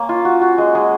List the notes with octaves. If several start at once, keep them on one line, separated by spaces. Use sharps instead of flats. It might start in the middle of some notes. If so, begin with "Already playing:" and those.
Already playing: A#3 C#4
F4
F#4
F#4
G#3
G#3